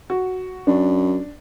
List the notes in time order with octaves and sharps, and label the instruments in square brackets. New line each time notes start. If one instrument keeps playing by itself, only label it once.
[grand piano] F#4
[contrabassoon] F#2 [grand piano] D4